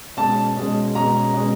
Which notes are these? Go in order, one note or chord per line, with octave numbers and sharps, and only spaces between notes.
B2 G#3 C#4 A5
B2 G#3 C#4
B2 G#3 C#4 A#5
B2 G#3 C#4